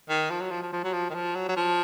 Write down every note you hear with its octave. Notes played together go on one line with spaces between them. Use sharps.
D#3
F3
F#3
F3
F3
F3
F#3
F3
D#3
F3
F#3
F#3
F3